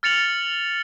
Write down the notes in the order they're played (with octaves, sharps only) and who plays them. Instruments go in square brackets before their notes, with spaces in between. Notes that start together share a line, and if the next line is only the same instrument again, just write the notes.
[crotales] F6 A6 C#7 F7 F#7